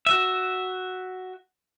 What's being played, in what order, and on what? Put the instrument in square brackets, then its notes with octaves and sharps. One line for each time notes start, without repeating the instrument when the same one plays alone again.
[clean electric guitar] F#4 E5